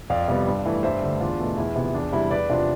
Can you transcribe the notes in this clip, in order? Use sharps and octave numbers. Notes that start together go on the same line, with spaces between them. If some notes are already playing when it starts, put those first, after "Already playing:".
F2 D5 F5
C3 G3 B3
G2
E3 A3
G2 C5 E5
D3 A3
E2 D4 F4
B2 A3
E2 E4
C3 F3 B3
E2 D4
C3 G3 E4
E2 B4 D5
C3 F3 D4 F4